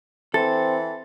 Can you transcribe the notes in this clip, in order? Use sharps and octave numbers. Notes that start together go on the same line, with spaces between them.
E3 C4 A4 A6